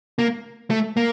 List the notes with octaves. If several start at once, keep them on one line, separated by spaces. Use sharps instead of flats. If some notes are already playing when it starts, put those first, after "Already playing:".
A#3
A3
A#3